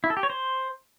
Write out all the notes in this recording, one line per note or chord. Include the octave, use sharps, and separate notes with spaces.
E4
A4
G4
C#5
C5